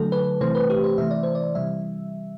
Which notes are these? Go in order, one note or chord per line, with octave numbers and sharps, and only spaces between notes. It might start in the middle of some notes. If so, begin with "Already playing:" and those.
Already playing: D3 F#3 A3 A4
B4
C3 E3 A3 C5
B4
G4
C5
C3 E3 A3 E5
D5
C5
D5
C3 E3 G3 E5